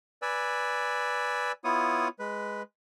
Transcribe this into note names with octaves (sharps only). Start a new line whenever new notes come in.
B4 D5 G#5 E6
B3 E4 F4 C#5 D#6
G#3 B4